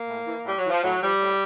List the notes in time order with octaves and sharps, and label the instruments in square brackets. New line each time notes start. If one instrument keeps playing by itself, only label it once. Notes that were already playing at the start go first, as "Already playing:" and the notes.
Already playing: [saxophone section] A#3
A2
E3
A2 G3
F#3
E3
F3
A2 F#3
F3 G3
A2